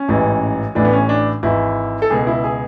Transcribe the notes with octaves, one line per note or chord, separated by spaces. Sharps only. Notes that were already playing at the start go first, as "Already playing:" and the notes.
Already playing: C#4
A1 G#2 E3
A1 A2 E3 D4
B3
C#4
D4
G#1 G#2 E3 E4
A4
C#2 B2 G#4
E4
G#4